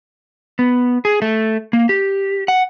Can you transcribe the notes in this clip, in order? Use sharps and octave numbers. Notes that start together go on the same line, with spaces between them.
B3
G#4
A3
A#3
G4
F#5